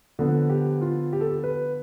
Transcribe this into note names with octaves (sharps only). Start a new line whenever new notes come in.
D3 F3 B3 A4
G4
F4
G4
A4
G4
B4